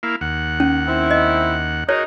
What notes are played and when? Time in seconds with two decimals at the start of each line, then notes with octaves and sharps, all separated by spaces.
0.03 A#3 E4 F5
0.21 D#2 F#5
0.60 C#4
0.88 C4 E4
1.11 D#5
1.89 D#4 F#4 G#4 A#4 C#5